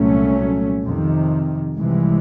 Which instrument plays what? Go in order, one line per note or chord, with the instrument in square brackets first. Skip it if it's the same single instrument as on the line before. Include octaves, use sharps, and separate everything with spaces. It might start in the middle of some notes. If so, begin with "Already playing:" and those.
Already playing: [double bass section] C2 A#2 F#3 A3 C#4
F2 C3 D#3
C2 C3 E3 G#3